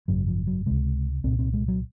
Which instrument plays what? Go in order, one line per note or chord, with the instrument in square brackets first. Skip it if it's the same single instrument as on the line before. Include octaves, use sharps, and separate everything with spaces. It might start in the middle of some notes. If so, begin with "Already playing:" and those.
[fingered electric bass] G#1 F#2 C#3 F#3
F3
F#3
C#2 C3 G#3
C2 A#2 C4
C4
G#3
F#3